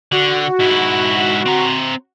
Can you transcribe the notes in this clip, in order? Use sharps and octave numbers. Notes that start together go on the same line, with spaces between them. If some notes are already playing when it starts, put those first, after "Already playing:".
D3 F#4
G#2 E4
C4 A#5